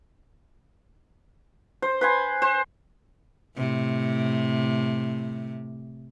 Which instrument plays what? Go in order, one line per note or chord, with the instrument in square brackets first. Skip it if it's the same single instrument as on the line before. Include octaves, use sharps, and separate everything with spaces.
[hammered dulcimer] C5
B4 C5 G#5
C5
[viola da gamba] A2 C3